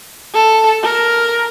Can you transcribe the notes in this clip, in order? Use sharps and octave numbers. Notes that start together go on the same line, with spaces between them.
A4
A#4